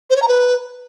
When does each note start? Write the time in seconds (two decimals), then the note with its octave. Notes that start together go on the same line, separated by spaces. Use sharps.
0.10 C5
0.16 C#5
0.22 A#5
0.28 B4